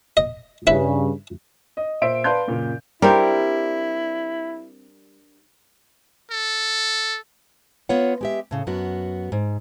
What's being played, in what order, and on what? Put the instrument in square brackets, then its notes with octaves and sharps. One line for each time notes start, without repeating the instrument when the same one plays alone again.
[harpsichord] D#5
[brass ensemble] G2 C#3 [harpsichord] E4 B4
[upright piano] D#5
A#2 C5 E5 D7
B4 D5 F5 A5 C6 G6
F#2 A#2 C#3
[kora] G3 C4 [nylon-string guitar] D4 G4 A#4 [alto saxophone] E4
[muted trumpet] A4
[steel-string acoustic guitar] B3 F4 C#5 F#5
G#3 G4 E5
A2 C#3
F#2 B3 F#4
G#2